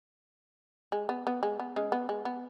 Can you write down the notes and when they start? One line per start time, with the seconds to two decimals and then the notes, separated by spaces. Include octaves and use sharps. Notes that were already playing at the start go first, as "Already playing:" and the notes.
0.92 G#3
1.09 B3
1.27 B3
1.43 G#3
1.60 B3
1.76 G#3 C#4
1.92 B3
2.09 G#3
2.25 B3